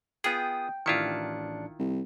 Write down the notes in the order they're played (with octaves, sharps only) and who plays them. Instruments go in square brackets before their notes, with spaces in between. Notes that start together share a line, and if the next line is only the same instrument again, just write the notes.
[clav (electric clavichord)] B3 F4 G#4 [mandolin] G5 [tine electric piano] D#6
[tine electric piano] A1 D4 C#7 [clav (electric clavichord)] D#3 E4 F4
[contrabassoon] C2